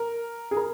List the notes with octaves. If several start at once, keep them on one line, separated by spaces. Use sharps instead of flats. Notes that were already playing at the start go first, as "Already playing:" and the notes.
Already playing: A#4
G#4
A#4